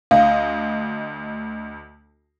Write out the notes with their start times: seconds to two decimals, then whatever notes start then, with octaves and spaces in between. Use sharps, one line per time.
0.11 D2 D#5 F5